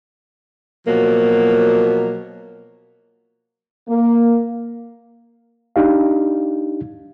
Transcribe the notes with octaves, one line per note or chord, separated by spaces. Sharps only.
B2 F3 F#3 A#3
A#3
D4 D#4 G4 F5